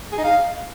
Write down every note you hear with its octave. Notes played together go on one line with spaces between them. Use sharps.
G#4
D#4
F5